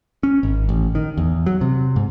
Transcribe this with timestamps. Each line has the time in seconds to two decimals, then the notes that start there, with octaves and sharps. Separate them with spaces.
0.23 C#4
0.43 G#1
0.69 A1
0.95 D#3
1.17 E2
1.46 F#3
1.61 C3
1.96 G#2